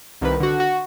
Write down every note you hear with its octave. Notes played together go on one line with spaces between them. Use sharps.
C2 D#3 B4
D3 F#4
F#4